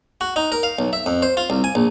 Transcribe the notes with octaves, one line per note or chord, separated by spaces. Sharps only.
F#4
D#4
A#4
F5
B1
E5
F2
C5
F4
C2
G#5
A#1